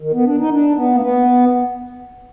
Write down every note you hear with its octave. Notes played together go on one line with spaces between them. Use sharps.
D#3
B3
D4
D#4
D4
B3
A#3
B3